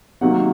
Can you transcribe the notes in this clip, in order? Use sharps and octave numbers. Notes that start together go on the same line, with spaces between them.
C3 D#3 F#3 A#3 F#5